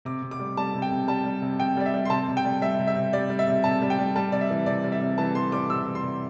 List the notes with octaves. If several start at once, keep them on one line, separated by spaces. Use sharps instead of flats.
C3 D6
C3
D6
G3
G3 A5
C3
G5
C3
G3 A5
G3
C3
C3 G5
G3 D5
E5
G3
C6
C3 A5
C3
G5
G3
G3 E5
C3
E5
C3
G3 D5
G3
E5
C3
C3 A5
G3
G5
G3
G3 A5
C3 D5
E5
E3
C3 D5
G3
E5
C3
E3 A5
C3 C6
G3 D6
C3 E6
E3
C6
C3